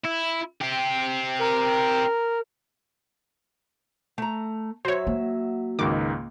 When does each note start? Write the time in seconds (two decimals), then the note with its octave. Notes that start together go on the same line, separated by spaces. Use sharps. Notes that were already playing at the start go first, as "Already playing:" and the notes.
0.04 E4
0.61 C4 G4
1.39 A#4
4.18 A3 A#5
4.85 F#3 C5 C#5 E5
5.07 A#3
5.79 C#2 G#2 D#3 D6